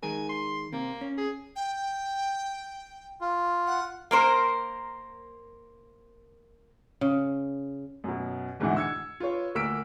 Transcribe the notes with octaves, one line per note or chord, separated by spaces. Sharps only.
D#3 G#3 A#4 G#5
C6
C3 A#3
C#4
G#4
G5
F4
F#5
A#3 A#4 C5
C#3
F#2 B2
E2 G#2 B2 D3 E3 F#5
E6 G#6 C#7
F4 B4 C#5
D2 A#3 A#4 E6 B6 D7